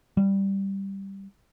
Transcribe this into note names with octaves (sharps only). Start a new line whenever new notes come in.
G3